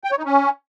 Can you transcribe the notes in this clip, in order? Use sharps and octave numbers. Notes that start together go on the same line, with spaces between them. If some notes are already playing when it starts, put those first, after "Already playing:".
G5
C#5
D#4
C#4